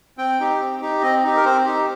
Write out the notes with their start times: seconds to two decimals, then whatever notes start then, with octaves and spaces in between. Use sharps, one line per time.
0.18 C4 G5
0.40 D#4 G4
0.60 C4
0.81 D#4 G4
1.02 C4 D#5
1.24 D#4 G4
1.37 A#4
1.44 C4 C5
1.65 D#4 G4